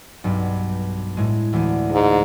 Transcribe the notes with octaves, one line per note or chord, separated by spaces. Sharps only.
B1 G2
A2 G#3
D2 E3
G#2